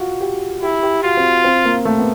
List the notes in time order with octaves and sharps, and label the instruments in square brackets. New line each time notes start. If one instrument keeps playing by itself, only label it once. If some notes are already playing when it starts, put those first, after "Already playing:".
Already playing: [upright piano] F4 F#4
G4
[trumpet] E4 [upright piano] G4
[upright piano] G4
[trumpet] F4 [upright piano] F#4
[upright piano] C4
C4
A#3
A3
B3